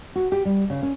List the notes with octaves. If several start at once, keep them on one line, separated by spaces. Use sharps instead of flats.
F#4
G4
G3
C#3
C#4